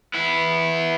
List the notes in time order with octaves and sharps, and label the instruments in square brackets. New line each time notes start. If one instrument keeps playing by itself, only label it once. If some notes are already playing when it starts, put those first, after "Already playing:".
[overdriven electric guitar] B3 E4